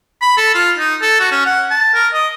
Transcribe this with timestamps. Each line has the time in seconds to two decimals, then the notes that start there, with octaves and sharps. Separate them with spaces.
0.22 B5
0.37 A4
0.54 F4
0.78 D#4
1.02 A4
1.20 F#4
1.31 C#4
1.46 F#5
1.71 A5
1.94 A#4
2.13 D#5